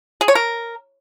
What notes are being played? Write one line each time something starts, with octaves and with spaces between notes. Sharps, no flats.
G#4
C#5
A#4